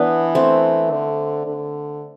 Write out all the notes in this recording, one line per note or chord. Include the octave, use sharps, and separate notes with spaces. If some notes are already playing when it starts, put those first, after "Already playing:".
Already playing: E3 B3 D4
A3 C4
D3
D3